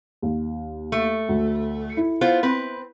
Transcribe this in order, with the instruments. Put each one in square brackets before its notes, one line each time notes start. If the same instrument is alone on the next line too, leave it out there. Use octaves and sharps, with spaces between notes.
[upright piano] D#2
[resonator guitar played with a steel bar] A3
[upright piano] D2
E4
[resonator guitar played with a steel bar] B3 F4 C5
C4 B4